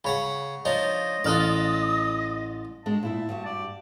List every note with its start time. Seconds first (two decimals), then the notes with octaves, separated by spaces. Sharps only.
0.04 C#3 C#5 F#5 B5
0.65 F3 D4 D#4 C#5 D#5
1.24 A1 F4 A4 D5 D#6 F6 F#6
2.86 B2 G#3 D4 A5
3.03 A#2 E4 E5
3.29 G2 G3 F#4
3.45 D5